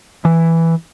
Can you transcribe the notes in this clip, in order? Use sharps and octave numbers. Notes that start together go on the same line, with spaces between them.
E3